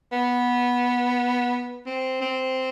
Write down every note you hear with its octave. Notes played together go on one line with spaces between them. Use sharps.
B3
C4
C4